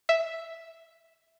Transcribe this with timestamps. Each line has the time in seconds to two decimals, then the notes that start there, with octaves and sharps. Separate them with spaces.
0.09 E5